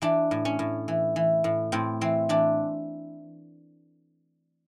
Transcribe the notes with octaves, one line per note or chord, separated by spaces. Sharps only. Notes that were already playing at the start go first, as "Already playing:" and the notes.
E3 D4
A2
C#4
A2
E3
E3
A2
A2 C4
E3 C4
E3 D4